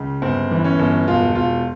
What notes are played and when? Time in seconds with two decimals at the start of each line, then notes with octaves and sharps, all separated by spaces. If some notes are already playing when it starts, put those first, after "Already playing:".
Already playing: C#2 C#3
0.22 G1 C4
0.51 E3
0.64 C#4
0.79 G1
1.08 E1 F4
1.35 E1 F4